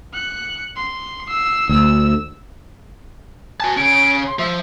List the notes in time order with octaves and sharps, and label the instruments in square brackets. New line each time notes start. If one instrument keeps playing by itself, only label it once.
[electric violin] F#6 C#7
C6
E6 C7
[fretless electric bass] D2 [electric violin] E6
[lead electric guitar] F#4 A5 [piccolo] G#5
[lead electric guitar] C#3 C#4 [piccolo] D7
[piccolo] C6
[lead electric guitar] F3 [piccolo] E5